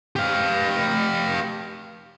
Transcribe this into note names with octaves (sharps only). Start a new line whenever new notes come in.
G4 F5